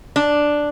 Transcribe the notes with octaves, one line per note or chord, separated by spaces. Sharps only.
D4